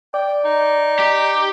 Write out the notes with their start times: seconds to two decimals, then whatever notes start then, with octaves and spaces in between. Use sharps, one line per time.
0.14 D5 G5
0.45 D#4
0.99 G4